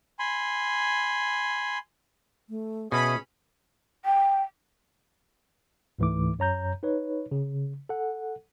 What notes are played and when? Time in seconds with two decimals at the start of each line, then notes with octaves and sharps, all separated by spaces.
0.19 G#5 B5 C6
2.50 A3
2.92 B2 C#4 G#4 E5 B5
4.05 G5
5.99 C#2 G#2 E3 A3 D6
6.39 F#2 C#5 A#5 G6
6.83 D#4 B4 C#5
7.31 C#3
7.89 A4 F#5